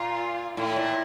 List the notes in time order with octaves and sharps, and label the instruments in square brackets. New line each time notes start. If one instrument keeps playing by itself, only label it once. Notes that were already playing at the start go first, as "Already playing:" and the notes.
Already playing: [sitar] A#2 [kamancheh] F4
[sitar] A2 [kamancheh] E4
[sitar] A#2